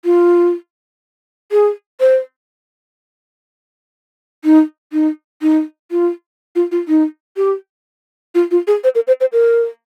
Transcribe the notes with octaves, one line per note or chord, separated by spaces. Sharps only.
F4
G#4
C5
D#4
D#4
D#4
F4
F4
F4
D#4
G4
F4
F4
G#4
C5
A#4
C5
C5
A#4